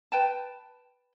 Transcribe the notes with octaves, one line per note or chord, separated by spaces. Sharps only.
B4 G5 A5